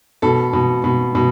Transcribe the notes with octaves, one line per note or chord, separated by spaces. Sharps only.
B2 A4
B2
B2
B2